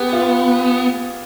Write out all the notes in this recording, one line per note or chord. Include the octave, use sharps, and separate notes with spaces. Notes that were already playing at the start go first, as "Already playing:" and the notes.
Already playing: B3 G4 G#4 B4
F4